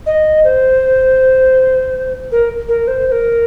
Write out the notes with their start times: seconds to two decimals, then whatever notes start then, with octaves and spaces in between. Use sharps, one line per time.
0.06 D#5
0.44 C5
2.32 A#4
2.68 A#4
2.88 C5
3.07 C5
3.12 A#4